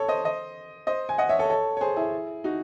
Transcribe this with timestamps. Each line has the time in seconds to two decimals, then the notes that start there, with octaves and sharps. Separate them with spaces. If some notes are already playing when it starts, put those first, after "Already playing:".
Already playing: A4 C#5
0.08 C5 D#5
0.24 C5 D#5
0.87 C5 D#5
1.09 G#5
1.18 D#5 F#5
1.29 C#5 E5
1.39 A4 C#5
1.50 A4 C#5
1.77 C#5
1.81 G#4 C5
1.96 E4 G#4
2.44 D#4 F#4